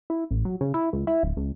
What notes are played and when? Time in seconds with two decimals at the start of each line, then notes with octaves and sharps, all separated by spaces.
0.10 E4
0.31 A1
0.45 F#3
0.61 C#3
0.74 E4
0.93 C#2
1.07 E4
1.23 D1
1.37 C#2